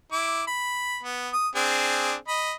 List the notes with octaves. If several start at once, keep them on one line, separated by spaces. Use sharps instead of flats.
E4 D6
B5
B3
D#6
C4 D4 G#4
D#5 B5